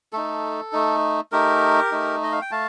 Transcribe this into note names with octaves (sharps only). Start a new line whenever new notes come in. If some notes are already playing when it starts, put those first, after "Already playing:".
A3 D#4 A4
A3 D#4
A3 D#4 G4 A#4
A3 D#4
D#5
F5
G5
A3 F5 A5